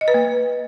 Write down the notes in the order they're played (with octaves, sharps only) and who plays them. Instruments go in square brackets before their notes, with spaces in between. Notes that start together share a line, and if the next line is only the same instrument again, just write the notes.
[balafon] D#5
B4
A#3